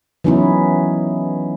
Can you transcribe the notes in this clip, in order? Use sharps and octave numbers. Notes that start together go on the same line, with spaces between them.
E3 F#3 B3 C#4 D#4 E4